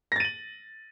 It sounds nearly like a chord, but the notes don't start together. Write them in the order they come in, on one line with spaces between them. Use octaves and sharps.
A#6 A6 D#7 F#7